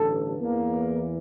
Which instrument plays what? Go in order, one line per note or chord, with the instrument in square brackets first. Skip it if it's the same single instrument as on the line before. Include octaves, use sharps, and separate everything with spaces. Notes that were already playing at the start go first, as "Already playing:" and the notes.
Already playing: [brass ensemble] A1 G2 D3 A4
E2 E3 A#3